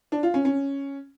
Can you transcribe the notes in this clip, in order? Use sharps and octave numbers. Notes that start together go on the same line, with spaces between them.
D4
F4
C#4
C#4